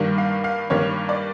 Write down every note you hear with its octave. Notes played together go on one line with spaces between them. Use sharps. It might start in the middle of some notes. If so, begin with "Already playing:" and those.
Already playing: G2 D#3 G3 A#3
F5
F5
G2 D#3 G3 A#3 C#5
D5